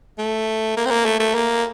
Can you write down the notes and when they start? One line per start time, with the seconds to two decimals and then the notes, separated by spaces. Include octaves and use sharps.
0.18 A3
0.77 A#3
0.86 C4
0.90 A#3
1.05 A3
1.19 A3
1.35 A#3